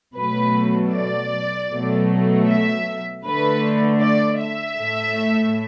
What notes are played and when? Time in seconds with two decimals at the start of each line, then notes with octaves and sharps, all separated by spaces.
0.15 B2 F#3 A3 B4
0.93 D5
1.70 B2 F#3 A3
2.47 E5
3.24 D3 A3 B4
4.02 D5
4.40 E5
4.79 A2 A3